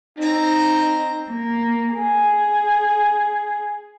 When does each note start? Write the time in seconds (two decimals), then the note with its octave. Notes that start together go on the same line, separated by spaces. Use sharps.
0.18 C4 D#4 A#5
1.30 A#3
1.95 G#4